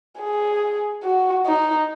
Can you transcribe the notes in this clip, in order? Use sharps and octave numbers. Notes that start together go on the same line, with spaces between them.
G#4
F#4
D#4